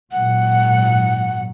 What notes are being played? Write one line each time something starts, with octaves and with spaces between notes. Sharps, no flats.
G#1 A#2 F#3 F#5